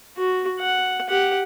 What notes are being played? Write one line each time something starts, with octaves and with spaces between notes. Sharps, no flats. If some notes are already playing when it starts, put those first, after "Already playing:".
F#4
F#5
G4 F#5